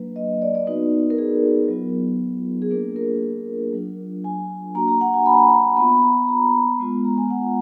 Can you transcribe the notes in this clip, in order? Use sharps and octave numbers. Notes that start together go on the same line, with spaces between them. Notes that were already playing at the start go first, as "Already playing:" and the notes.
Already playing: F#3 A#3 D4 B4
D#5
D5
D5
B3 D#4 F#4 B4
A#4
G#4
F#3 B3 F4
G#4
A#3 D4 F4 A#4
A#4
F#3 D4 F4
G#5
A#3 D4 F#4 A#5
A#5
F#5
G#5
B5
A#5
G#5
A#5
B3 F4 B5
A#5
A#5
G#3 B3 F4
A#5
G#5
F#5